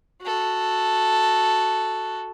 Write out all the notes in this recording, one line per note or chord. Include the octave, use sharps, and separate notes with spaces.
F#4 A4